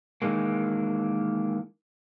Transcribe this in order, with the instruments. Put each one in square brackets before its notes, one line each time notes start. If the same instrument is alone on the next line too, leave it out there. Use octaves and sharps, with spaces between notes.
[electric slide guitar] D#3 E3 G#3 A#3